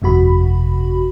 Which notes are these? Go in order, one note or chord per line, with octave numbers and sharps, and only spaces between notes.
G1 F2 C3 F#4 B5